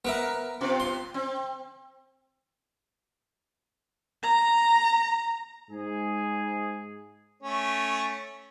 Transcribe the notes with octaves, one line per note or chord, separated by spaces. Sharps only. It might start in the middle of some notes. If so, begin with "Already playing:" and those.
B3 A#4 B4 E5
C3 B3 F4
C6
C4
A#5
G#2 G#4
A3 C#4